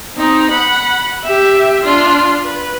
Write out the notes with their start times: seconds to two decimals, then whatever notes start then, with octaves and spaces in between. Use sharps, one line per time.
0.16 C4 D#4
0.51 F#5 B5
1.25 G4 E5
1.84 D4 F4
2.44 B4